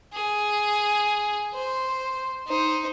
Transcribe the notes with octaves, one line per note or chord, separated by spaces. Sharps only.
G#4
C5
D#4 C5